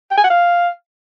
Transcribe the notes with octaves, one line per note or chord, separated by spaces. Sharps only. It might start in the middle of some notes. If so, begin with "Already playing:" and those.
G5
G#5
F#5
F5